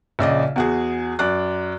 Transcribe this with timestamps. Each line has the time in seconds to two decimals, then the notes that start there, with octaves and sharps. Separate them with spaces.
0.19 A#1 C#3 D5 D#5
0.56 E2 F#4 G#4
1.19 F#2 D5 F#6